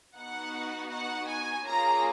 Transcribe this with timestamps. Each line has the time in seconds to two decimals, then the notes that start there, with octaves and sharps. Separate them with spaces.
0.17 B3 D#4 F#4 F#5
0.92 F#5
1.29 G#5
1.66 A#3 C#4 F4 G#4 A#5